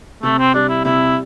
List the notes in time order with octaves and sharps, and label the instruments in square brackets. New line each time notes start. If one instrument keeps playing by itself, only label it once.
[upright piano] C3 [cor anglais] A3
[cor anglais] C4
[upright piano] G3 [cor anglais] D4
[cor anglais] E4
[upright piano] C3 [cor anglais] E4